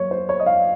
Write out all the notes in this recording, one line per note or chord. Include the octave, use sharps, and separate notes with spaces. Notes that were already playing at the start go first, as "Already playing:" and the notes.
Already playing: F#3 A#3 C#5
C5
C#5
D#5
F5